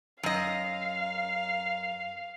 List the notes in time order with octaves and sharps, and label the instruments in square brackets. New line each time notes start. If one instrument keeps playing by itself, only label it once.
[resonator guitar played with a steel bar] F#2 D#5 [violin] F5